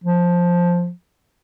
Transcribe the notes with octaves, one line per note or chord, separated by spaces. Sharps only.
F3